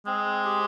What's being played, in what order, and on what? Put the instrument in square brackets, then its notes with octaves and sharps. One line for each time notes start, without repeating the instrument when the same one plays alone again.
[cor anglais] G#3 [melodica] C4
[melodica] G4